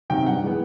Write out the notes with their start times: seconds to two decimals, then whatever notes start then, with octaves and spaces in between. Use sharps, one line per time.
0.10 C3 D#3 F#3 G5
0.26 G2 F#5
0.42 E3 G#3 B3